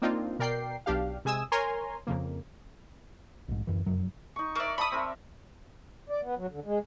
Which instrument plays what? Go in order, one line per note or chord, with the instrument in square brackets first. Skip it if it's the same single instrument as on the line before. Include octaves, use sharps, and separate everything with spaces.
[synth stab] A#3 C4 D4 D#4 F4
B2 A#4 D5 G5 C7
B1 D4 G4 F5
C3 G#3 G#5 D#6 E6 E7
A#4 C#5 G#5 A#5 C6
F2 C#3 A#3
[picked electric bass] A#1 G#2
D1 G1 F#2 E3
F1 F#2 F#3
[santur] D#4 C#6
[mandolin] A#3 D5 [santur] E5 C#6
[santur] D5 A5 C#6 [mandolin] B5 D#6
[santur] C4 A#4 E5
[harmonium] D5
B3
F#3
D3
G#3